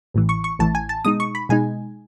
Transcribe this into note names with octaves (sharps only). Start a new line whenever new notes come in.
A1 A2 E3
C#6
C#6
A1 A2 E3 A5
G#5
A5
B2 G#3 D#4 D#6
C#6
B5
B2 G#3 D#4 G#5